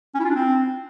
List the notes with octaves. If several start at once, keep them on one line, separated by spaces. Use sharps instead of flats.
C#4
E4
F4
D4
C4